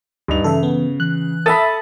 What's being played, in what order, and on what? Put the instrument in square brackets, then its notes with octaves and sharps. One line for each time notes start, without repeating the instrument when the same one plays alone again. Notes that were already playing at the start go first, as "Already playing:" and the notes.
[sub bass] D2 [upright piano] G2 D#4 F7
[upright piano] C#3 [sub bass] E3 [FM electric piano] A4 E5
[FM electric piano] B3
[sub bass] E3 [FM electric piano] F#6
[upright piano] A4 [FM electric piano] E5 D#6 [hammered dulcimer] A5 B5